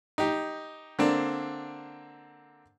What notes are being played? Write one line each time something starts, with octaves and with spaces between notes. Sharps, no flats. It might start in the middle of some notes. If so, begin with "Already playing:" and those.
D#4 G4
D3 A#3 C4 D4